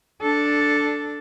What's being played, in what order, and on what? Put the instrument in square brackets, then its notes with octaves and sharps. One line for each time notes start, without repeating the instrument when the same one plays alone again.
[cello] D4 A4